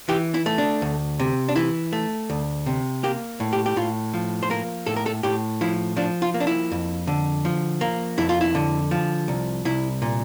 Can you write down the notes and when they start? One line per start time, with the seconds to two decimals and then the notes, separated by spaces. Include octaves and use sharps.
0.09 E3 G4
0.34 E4
0.46 A3
0.58 D4
0.82 D2
1.20 C3
1.48 D4
1.55 E3 E4
1.93 A3
2.30 D2
2.66 C3
3.03 A#3 G4
3.40 A2
3.53 G4
3.66 G4
3.76 A2 F4
4.14 F3
4.43 C5
4.50 A#3 A#4
4.86 A2 A4
4.96 A#4
5.06 A4
5.23 A2 G4
5.61 F3 E4
5.97 F3 D4
6.22 F4
6.34 A#3
6.40 D4
6.47 E4
6.71 F2
7.07 D3
7.45 F3
7.81 A#3
8.18 F2 E4
8.29 F4
8.41 E4
8.55 D3
8.91 F3
9.28 C2
9.65 C2 E4
10.02 A#2